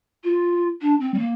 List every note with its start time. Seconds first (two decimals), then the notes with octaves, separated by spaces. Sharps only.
0.24 F4
0.82 D4
1.00 C4
1.14 G3
1.19 A#3